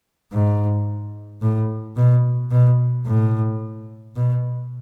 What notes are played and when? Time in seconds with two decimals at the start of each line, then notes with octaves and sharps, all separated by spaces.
0.33 G#2
1.42 A2
1.97 B2
2.51 B2
3.06 A2
4.16 B2